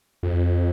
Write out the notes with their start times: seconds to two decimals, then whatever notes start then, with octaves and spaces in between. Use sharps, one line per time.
0.23 F2